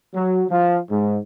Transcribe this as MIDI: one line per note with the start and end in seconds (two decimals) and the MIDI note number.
0.14 0.44 54
0.50 0.78 53
0.90 1.18 44